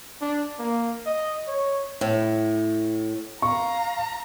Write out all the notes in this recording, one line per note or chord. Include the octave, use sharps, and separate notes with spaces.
D4
A#3
D#5
C#5
A2
F5 A#5 C#6